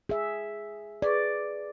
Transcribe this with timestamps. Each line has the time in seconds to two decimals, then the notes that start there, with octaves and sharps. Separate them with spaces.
0.09 G#4 E5
1.02 G#4 B4 D5 C#6